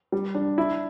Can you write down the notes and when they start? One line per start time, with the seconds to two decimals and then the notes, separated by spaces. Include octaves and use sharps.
0.12 G3
0.35 D4
0.58 E4